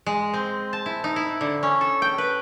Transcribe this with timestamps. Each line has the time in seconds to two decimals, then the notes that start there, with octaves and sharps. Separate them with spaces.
0.06 G#3
0.34 C4
0.73 A5
0.86 E4
1.04 D#4
1.16 E4
1.41 D3
1.63 C#4
1.81 A4
2.02 G5
2.18 B4